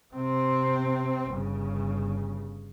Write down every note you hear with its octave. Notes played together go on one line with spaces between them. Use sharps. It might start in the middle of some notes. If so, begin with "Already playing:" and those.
C3 C4
G1 C#3